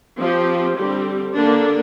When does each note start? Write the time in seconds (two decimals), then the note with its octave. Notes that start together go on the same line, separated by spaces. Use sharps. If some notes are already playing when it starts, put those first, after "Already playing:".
0.19 F3 C4 G4
0.77 D3 G3 C4 G4
1.34 D3 A#3 D4